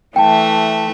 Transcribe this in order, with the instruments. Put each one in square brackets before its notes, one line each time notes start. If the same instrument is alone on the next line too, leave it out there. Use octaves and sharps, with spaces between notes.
[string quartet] E3 A3 E5 [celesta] G5 A5